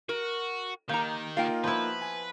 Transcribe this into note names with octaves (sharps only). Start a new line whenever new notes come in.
F#4 A#4
D#3 A#3 G4 A#5
A#3 D#4 F4 F5 G5
F3 B3 E4 B4
G#5